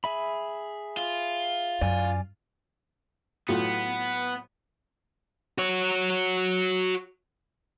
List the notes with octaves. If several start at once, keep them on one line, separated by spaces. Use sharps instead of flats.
G#4 E5 B5
F4
F#2 D5 G#5
A2 F#3 B3 F4
F#4 C#5